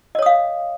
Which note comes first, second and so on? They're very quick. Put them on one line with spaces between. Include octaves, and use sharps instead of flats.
D#5 C#5 D#6 F5